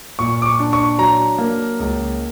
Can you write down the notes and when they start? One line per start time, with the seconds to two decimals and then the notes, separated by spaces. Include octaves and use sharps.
0.19 A#2 C#6
0.42 D6
0.46 C#6
0.60 D4
0.73 C#6
0.98 F#3 A#5
1.38 A#3
1.79 C#2